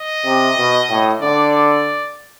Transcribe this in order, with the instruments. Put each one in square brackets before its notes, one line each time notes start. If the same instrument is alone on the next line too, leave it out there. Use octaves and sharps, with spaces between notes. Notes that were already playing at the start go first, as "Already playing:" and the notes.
Already playing: [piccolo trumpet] D#5
[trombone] C3
B2
A2
[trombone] D3 [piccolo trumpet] D5
[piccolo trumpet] D5